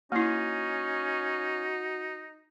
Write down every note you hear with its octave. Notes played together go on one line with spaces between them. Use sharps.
A#3 C#4 D#4 E4 F#4